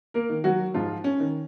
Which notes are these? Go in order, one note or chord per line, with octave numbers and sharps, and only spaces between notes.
A#3 A#4
D#3
F#3 F#4
G#2 F3 F4
C#4
D#3